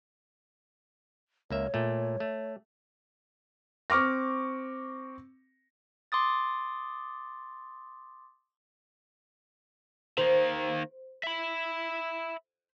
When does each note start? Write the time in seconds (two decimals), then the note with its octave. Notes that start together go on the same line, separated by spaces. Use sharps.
1.50 C#2 A#3 C#5 E5
1.74 A#2 A3
2.20 A3
3.90 C4 C#6 D6 F6 A#6
6.12 C6 D6 D#6 A6
10.18 D#3 A#3 C5
11.24 E5 B5